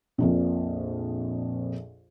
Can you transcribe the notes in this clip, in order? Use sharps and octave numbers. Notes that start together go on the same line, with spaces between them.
A#1 F2 A#2